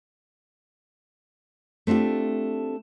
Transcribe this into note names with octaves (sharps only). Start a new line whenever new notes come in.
A3 C4 D4 F4 G4